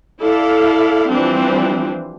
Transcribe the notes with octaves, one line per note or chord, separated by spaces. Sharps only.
E4 A4 D5 F5
E3 F3 G3 C4 D4